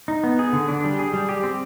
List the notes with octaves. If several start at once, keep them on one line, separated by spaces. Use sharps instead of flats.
D#4
B3
G#4
D3
D4
G3
G#4
G3
G4
C4